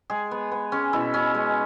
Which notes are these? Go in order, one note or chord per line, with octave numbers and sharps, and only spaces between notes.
G#3 G#4
B3
B3
G#3 C#4
B2 E4
B2 C#4
G#3